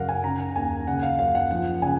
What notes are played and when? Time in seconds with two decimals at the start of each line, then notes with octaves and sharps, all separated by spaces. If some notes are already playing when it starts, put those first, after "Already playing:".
Already playing: F#2 C#3 A#4 F5 F#5
0.09 G#5
0.24 C#3 A#5
0.56 D#2 G#5
0.87 C#3 F#5
1.03 F5
1.19 F#2 F5
1.35 F#5
1.51 F3 F#5
1.82 C#3 G#5